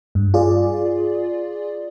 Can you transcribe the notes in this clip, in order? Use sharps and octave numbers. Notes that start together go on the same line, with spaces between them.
G2
F4 G#4 D5